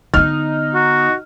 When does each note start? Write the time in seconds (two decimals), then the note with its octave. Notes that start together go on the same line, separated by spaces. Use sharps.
0.14 D3 B3 D#4 F6
0.74 F#4